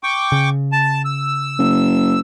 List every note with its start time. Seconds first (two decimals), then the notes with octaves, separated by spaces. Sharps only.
0.03 G5 C#6 D6
0.32 C#3
0.72 A5
1.05 E6
1.59 F#1